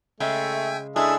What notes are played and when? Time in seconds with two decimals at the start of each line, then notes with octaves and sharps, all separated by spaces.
0.20 C#3 G#3 A3 E5 G5 G#5
0.96 G#3 D4 E4 G#4 A4 E5